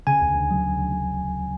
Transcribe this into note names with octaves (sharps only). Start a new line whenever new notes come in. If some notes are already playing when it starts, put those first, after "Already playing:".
C#3 G#5
D2
D2
F#3
C#3
D2
D2